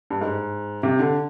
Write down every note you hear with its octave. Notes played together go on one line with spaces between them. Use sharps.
G2
G#2
C3
D3